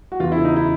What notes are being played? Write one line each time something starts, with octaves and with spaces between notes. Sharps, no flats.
F#4
E2 F4
E4
C#3
D#4
E4